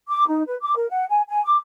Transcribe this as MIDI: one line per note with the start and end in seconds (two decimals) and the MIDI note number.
0.09 0.27 86
0.27 0.43 63
0.47 0.55 71
0.61 0.73 86
0.76 0.86 70
0.89 1.05 78
1.09 1.21 80
1.28 1.40 80
1.45 1.56 86